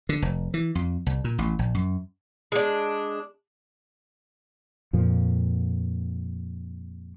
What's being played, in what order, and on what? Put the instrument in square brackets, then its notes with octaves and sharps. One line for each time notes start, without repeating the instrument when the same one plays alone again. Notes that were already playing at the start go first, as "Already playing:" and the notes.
[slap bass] D3
F1
E3
F2
C2
A#2
A1
A#1
F#2
[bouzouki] G#3 D4
[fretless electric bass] F2 A#2 F3